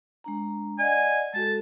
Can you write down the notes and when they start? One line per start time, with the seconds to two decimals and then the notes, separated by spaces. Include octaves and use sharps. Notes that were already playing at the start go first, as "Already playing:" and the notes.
0.24 G#3 D4 A#5
0.78 D5 D#5 F#5 G#5
1.34 G#3 F#4 A4 A5